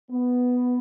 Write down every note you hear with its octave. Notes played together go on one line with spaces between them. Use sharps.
B3